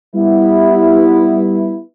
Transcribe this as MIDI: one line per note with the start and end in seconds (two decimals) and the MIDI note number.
0.15 1.81 55
0.15 1.81 59
0.15 1.81 64